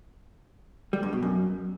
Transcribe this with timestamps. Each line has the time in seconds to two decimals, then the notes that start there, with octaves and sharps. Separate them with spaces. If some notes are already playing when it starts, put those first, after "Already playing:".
0.93 G3
1.03 G2
1.13 B2
1.23 F#2